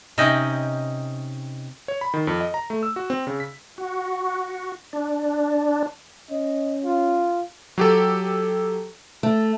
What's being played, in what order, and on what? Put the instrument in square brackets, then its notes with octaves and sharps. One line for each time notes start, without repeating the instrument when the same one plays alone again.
[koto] C3 C#4 D#4 D#5 G5
[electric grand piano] C#5
B5
D#3
F2
D#5
A#5
A3
E6
F#4
C4
C#3
B6
[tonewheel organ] F#4
D4
[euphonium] C#4 [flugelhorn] D#5
[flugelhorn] F4
[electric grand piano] F#3 G4 A4
[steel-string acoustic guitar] A3